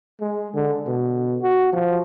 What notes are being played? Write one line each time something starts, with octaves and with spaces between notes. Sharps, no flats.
G#3
D3
B2
F#4
F3